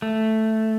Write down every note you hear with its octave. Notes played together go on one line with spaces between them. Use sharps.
A3